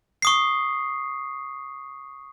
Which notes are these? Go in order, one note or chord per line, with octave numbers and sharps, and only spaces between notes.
C#6 D#6 C7